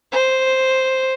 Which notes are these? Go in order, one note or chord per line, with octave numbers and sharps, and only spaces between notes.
C5